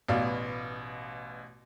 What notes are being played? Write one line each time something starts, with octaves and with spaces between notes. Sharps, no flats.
A1 B2 B3 D5 F5